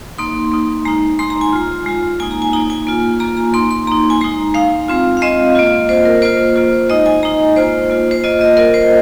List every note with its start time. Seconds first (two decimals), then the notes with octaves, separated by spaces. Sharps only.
0.18 A#3 D#4 C6
0.52 A#3 D#4
0.85 G#3 D#4 A#5
1.19 G#3 D#4 C6
1.30 A#5
1.41 G#5
1.53 G#3 F4
1.86 G#3 F4
2.20 A#3 D#4 G#5
2.31 A#5
2.42 G#5
2.53 A#3 D#4 A#5
2.70 G#5
2.87 A#3 F4
3.20 A#3 F4 A#5
3.37 A#5
3.54 A#3 D#4 C6
3.71 C6
3.87 A#3 D#4 A#5
4.10 G#5
4.21 G#3 D#4 A#5
4.54 G#3 D#4 F5
4.88 G#3 C4 F4
5.17 F5
5.22 G#3 C4 F4 D#5
5.55 A#3 F4
5.89 A#3 F4 C5
6.05 A#4
6.22 A#3 F4 C5
6.56 A#3 F4
6.90 G#3 D#4 D#5
7.06 G#5
7.23 G#3 D#4 A#5
7.56 A#3 F4 C5
7.90 A#3 F4
8.11 C5
8.24 A#3 F4 D#5
8.41 D#5
8.57 A#3 F4 A#4
8.74 C5